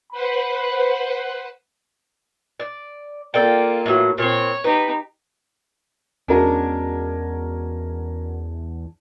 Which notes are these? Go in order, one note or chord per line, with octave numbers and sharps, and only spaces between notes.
B4 C5 F#5 B5
D5
A#3 F4 A4 D5 G5
A2 E3 F#3
A#2 C4 C#5
D#4 G4 B4
E2 G#3 C#4 D4 F#4 A#4